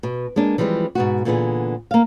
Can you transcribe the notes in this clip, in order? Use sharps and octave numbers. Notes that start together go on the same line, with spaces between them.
B2
G#3 A#3 D4
E3 F3 G3 G#3 C4
G#2 B2 F#4
A#2 D3 E3 B3 G#4
A#3 F5